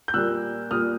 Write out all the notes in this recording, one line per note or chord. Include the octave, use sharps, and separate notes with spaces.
G6
A#2 G3 A#3 E6 F#6
A#2 G3 A#3 D#6 F6